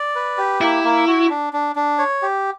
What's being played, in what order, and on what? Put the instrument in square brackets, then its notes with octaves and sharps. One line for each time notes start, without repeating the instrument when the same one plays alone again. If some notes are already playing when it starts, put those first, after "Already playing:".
Already playing: [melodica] D5
B4
G4
[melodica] A#3 [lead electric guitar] E4
[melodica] A#3
F#4
D4
D4
D4
C#5
G4